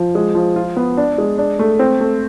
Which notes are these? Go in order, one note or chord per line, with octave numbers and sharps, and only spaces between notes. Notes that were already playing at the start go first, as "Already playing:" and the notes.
Already playing: F3
G#3
F3
F4
B3
D4
G#3
D4
A3
C4
A3